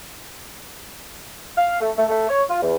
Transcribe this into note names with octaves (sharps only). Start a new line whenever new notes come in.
F5
A3
A3
A3
C#5
F4
E2